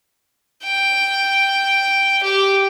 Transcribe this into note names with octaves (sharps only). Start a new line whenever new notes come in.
G5
G4